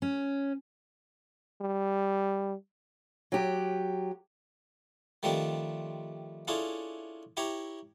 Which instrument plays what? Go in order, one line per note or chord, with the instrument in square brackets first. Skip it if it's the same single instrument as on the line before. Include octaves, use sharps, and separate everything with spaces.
[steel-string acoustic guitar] C#4
[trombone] G3
[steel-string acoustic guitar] F#3 G4
[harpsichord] D#3 F3 G3 A3 C4 D4
C#4 D4 E4 F4 G#4 A4
E4 G4 C#5 A#5